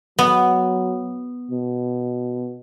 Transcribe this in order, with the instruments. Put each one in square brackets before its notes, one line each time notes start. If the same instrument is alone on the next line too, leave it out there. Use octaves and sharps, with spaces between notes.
[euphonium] F#3 [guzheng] B3
[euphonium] B2